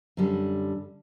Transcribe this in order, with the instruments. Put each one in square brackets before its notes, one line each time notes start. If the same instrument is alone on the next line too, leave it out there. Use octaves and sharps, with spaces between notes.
[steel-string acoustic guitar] F#2 D3 G3